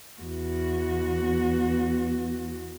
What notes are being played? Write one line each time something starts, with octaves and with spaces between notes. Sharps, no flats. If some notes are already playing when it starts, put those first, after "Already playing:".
E2 F#4
B3